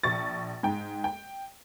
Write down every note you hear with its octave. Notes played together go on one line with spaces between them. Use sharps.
A#1 C#6 A6
G#2 G5
G5